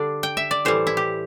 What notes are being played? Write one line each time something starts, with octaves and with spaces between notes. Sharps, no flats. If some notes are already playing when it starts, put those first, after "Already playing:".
Already playing: D3 G3 D4 D5
G5
E5
D5
A2 E3 G3 C5
E4
G4